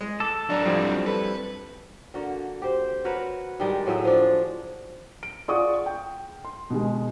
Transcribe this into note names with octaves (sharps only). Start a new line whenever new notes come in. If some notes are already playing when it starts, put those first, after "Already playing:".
G#3
A4 D6
F#3 D4 D5 A#5
F2 G3 C4 E4
A4 B4
D3 A#3 F#4
G4 C5
F#4 A#4 B4 C#5
D#3 G3 G#3
A2 F#3 G#4 E5
F3 D4
D7
F4 G#4 D5 F#5 C#6 D#6
G5
C6
B2 D#3 G#3